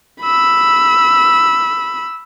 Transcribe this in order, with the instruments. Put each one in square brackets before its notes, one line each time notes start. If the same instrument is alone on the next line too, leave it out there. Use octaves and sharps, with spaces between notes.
[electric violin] B5 E6